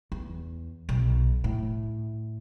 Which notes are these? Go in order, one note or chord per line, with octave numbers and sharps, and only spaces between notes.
E2
B1
A2